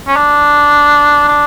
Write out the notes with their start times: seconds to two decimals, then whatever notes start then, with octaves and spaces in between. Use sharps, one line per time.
0.07 C#4
0.16 D4
1.28 D4